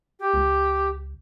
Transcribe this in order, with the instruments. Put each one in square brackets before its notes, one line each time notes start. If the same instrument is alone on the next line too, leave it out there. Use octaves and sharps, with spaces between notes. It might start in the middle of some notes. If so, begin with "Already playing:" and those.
[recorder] G4
[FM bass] C#2